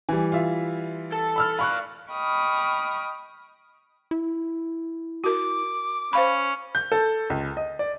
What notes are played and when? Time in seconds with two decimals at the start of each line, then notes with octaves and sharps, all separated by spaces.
0.09 E3 G3 G#5
0.32 F4 E5
1.12 A4
1.36 B5 E6 F6
1.59 D5 F5 B5 C#6 F#6
2.09 D#5 G5 B5 C#6 D#6 F6
4.11 E4
5.24 F#4 A#4 D6
6.13 C#4 C5 F5 B5
6.75 G6
6.92 A4
7.30 C#2
7.57 D#5
7.79 D5